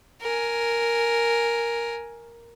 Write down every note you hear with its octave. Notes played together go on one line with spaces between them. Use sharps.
A#4 G#5